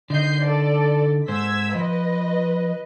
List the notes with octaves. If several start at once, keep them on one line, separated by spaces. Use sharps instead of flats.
D3 D#4 D#5 G6 C7
A4 D5
G#2 C5 E6 G#6 B6
F3 B4 D#5